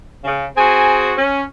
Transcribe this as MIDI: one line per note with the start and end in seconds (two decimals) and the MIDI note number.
0.24 0.45 49
0.56 1.13 60
0.56 1.13 66
0.56 1.13 68
0.56 0.96 80
1.16 1.42 61